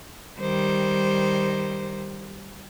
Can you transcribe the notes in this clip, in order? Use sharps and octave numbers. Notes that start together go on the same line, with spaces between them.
D#3 G3 C5